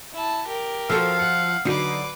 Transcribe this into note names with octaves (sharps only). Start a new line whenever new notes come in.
E4 A5
G4 A#4
F3 F4 F#4 A4 F5 E6
F#5 C#7
D3 F#3 D#4 B4 D6 C7